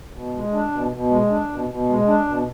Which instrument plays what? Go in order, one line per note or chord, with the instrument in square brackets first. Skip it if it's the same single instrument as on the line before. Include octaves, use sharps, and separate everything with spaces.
[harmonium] B2
G#3
D4
B2
B2
G#3
D4
B2
B2
G#3
D4
B2